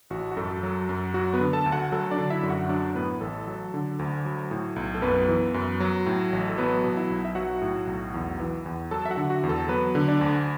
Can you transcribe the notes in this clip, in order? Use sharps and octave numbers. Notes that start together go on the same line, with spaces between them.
A1 F#4
F#4
F#2 A4
F#3
F#2
F#3 F#4
B3 B4
D3
A4 A5
D2
F#4 F#5
F#3 A4
D4 D5
D3
E4 E5
F#2
F#4 F#5
F#3 D4 D5
A2 B3 B4
A1 A4
F#3
D3
D2
F#3
A2
B1
A4
F#2 B3 B4
E3
F#2
F#3
A2
A1
A4
F#3 B3 B4
B2
E4 E5
B1
E5
F#3 F#4 F#5
A2
B1
E2
E3
E2
F#3 A4 A5
E5
F#4 F#5
D3
F#4
E2
A4
F#3 B3 B4
D3
D4 D5
D2